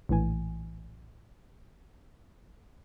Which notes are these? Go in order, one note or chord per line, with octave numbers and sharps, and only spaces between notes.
A#1 A2 E3 G#5